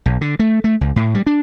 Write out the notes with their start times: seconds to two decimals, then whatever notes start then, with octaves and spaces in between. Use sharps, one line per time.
0.06 B1
0.21 D3
0.39 A3
0.64 A3
0.81 C#2
0.96 A2
1.15 G3
1.27 D4